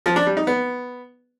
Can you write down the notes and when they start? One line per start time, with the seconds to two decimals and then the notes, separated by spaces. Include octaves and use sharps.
0.06 F3
0.16 D4
0.26 G3
0.37 D#4
0.47 B3